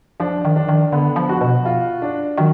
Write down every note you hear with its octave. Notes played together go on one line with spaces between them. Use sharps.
F3 D4
D#3
D4
D#3
D3 B3
F3
F#4
B2
F4
D4
D#3 F#3